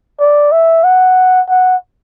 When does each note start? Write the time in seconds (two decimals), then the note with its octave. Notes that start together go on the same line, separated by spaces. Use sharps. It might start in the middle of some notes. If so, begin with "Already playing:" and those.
0.20 D5
0.52 E5
0.84 F#5
1.49 F#5